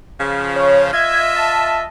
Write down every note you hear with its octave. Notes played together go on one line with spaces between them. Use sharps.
C#3 F3
C#5
F4 D#5 E5 G#6
A5